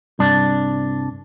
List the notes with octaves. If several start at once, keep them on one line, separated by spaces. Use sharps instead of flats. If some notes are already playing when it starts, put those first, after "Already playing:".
C2 G2 D4